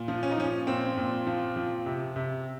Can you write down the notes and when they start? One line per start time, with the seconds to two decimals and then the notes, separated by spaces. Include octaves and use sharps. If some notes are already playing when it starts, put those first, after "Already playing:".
Already playing: A#2
0.08 F3
0.23 C#4
0.31 D#4
0.38 F3 C#4
0.67 A#2 C4
0.97 A#2
1.27 F3
1.56 F3
1.86 C3
2.16 C3